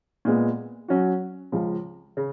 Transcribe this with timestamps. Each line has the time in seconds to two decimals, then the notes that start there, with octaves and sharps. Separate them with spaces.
0.25 A#2 G#3 B3
0.88 F#3 C#4 F#4
1.52 C#2 C#3 F3
2.17 C#3